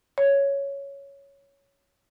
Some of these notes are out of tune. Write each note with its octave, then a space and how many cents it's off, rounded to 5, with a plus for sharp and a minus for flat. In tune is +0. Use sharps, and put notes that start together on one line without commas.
C#5 +5